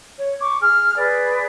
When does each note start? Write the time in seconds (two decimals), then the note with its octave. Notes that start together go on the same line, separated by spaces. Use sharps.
0.18 C#5
0.39 C#6 D6
0.60 G#4 F6
0.95 G#4 B4 D5